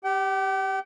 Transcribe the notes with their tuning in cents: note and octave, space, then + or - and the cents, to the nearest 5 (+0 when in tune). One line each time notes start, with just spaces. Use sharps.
G4 +0 G5 -40